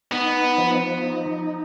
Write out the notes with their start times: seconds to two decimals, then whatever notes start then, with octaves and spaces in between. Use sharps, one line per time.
0.12 B3 D#4
0.58 F3
1.03 D#4